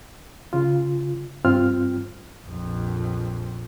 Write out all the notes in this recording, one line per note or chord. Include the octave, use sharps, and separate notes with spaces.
C#3 F4
G2 C4 F4 F6
A#1 F2